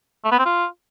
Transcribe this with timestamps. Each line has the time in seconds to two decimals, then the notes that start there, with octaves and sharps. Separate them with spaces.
0.24 A3
0.31 B3
0.38 C4
0.45 F4